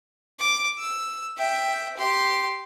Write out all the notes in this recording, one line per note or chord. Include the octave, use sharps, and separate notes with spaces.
D6
E6
E5 G5
G4 C6